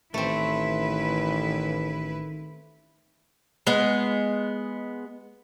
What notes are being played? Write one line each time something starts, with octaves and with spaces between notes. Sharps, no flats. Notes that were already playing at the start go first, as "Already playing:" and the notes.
A1 D#3 A3 C4 E4 B4
G#3 B3